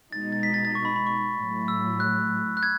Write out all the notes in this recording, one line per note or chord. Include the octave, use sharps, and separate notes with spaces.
B2 G#3 D#4 A6
A6
B6
A6
A6
C#6
B5
B5
C#6
A2 F#3 A3
E6
F#6
F#6
G#6